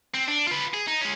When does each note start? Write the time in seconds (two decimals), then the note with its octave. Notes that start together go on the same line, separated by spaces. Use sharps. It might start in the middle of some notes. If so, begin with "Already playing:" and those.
0.14 C4
0.28 D4
0.47 F4 B4
0.74 G#4
0.88 D#4
1.01 G#3 C#4